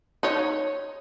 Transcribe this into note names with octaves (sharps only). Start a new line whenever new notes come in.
D#4 C#5